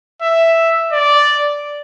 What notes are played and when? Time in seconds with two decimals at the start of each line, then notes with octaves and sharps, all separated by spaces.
0.22 E5
0.92 D5